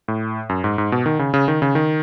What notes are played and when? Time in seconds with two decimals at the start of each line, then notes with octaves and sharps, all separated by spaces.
0.08 A2
0.49 F#2
0.64 G#2
0.78 G#2
0.92 B2
1.06 D#3
1.19 C#3
1.34 C#3
1.48 D#3
1.62 C#3
1.75 D#3